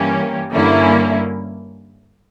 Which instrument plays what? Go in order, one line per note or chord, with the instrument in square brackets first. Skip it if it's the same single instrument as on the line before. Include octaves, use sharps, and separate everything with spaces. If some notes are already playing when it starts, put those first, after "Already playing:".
Already playing: [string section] G2 E3 A#3 C#4 G4
G2 D3 A#3 C#4 E4